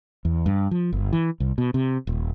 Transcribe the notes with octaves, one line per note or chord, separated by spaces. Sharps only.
E2
G2
F3
G1
E3
C2
B2
C3
D#1